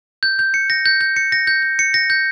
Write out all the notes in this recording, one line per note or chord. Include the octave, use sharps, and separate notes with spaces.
G6
G6
C#7
A#6
G6
G6
C#7
A#6
G6
G6
C#7
A#6
G6